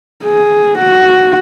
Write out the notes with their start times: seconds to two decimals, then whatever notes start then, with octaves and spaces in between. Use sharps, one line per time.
0.24 G#4
0.79 F#4